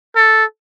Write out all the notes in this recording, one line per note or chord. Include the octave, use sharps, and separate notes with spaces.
A4